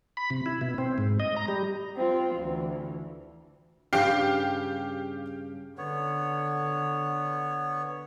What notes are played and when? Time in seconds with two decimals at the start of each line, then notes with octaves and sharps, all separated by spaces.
0.17 B5
0.30 C3
0.46 E4
0.61 B2
0.78 C4
0.98 G#2
1.20 D#5
1.36 A#5
1.48 G3
1.96 C4 F4
2.36 D2 E3
3.93 G2 C#3 G4 F5
5.78 D3 B3 C#5